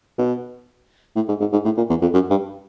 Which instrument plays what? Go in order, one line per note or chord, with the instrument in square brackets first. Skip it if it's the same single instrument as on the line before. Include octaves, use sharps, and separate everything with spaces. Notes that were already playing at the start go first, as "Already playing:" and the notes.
[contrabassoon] B2
A2
G#2
G#2
G#2
A2
A#2
E2
F2
F#2
G2